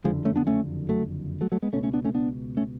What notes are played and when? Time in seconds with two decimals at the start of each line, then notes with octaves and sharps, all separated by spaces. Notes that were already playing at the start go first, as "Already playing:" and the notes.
0.04 F#1 F2 D3 F3 G#3
0.25 A3 C#4
0.36 B3 D4
0.47 A3 C#4
0.89 F#3 A3
1.41 F#3 A3
1.52 F#3 A3
1.62 G#3 B3
1.73 C#2 B2 A3 C#4
1.83 A3 C#4
1.94 B3 D4
2.04 A3 C#4
2.15 B3 D4
2.57 A3 C#4